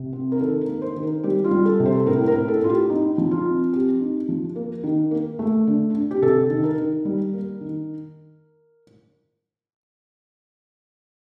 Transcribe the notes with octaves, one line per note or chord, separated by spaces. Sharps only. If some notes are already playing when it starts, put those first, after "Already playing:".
Already playing: C3
C4
A#4
D#3 A4
A#4
A#3
C5
D#3
A#4
G3 G4
F4
G3
A4
C3
C5
A4
A2 A#4
A#4
A2
A4
A2 F4
G4
D#4
F3
F4
C4
C4 G4
D#4
F3
A#3
D#3
A#3
A3
D3
D3
G4
C3 A4
D#3
A#4
D#3
G3
A#3
D#3